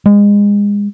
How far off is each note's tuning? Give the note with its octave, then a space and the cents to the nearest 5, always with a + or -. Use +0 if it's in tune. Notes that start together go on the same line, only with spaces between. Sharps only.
G#3 -30